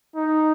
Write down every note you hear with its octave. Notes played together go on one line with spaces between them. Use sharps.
D#4